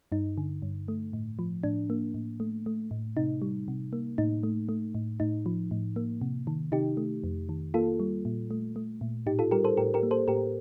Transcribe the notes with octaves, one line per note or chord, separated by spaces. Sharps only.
G2 D#4
D3
G2
A3
A2
F3
A2 D4
A#3
A2
A3
A3
A2
C3 D#4
G3
C3
A#3
A2 D#4
A3
A3
A2
A2 D#4
F3
A2
A#3
C3
D#3
C3 D#4 G4
A3
F2
D#3
A#3 F4 A4
G3
A#2
A3
A3
A#2
A2 D#4 G4
F4 A4
G3 G4 A#4
A4 C5
A2 G4 A#4
G4 A#4
A#3
A4 C5
A2 G4 A#4